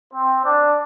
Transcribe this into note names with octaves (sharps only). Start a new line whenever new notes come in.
C4
D4